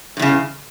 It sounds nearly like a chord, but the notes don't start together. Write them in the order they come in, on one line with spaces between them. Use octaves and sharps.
G2 E2 C#3